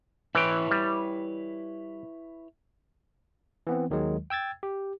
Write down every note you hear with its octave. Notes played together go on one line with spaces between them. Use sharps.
E3 E4 B4 C#5 G5
G3
E3 B3 C4
D#2 D#3 F#3 G#3
G5 E6 G#6 A6
G4